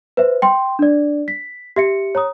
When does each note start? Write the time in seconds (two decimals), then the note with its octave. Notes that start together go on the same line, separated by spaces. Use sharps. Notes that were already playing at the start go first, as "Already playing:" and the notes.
0.17 B4 C5 E5
0.42 G5 C6
0.79 D4 D5
1.28 B6
1.76 G4 E5 C#7
2.15 C#5 A#5 D#6